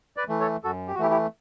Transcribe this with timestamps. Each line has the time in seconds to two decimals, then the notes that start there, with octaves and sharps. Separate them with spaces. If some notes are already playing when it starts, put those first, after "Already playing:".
0.17 B4 D5
0.28 E3 A3
0.40 A4 C#5
0.64 F#2 F#4 A4
0.88 G4
0.95 F#4
0.99 E3 A3 E4 G4
1.10 E4 G4